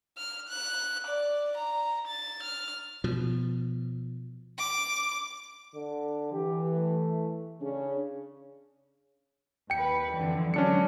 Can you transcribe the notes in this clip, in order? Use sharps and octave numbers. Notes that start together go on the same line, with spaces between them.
F6
F#6
D5
A#5
A6
F6
B2 F3
D6
D3
E3 G4
A3
C#3 C#4 D4 G#4
D#2 B4 G5 C#7
F2 D3 E3
D3 F#3 G#3 C#4 D4 C#7